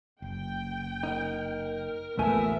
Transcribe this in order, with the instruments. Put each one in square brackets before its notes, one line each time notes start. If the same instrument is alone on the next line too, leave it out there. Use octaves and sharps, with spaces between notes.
[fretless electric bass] F#1 [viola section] G5
[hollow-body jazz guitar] D#4 [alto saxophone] A#4
[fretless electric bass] A1 D#2 F3 [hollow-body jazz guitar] A3 G#5 [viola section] B3 E5 [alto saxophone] A#4